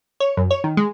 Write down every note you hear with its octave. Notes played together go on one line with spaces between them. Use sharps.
C#5
F#2
C#5
D#3
G#3